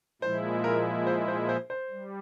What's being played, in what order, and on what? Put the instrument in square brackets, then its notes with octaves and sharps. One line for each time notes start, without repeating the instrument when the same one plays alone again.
[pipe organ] A#2 F3 G#3 E4 [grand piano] C5
[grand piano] A#4
C5
C5
C5
C5
[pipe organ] G3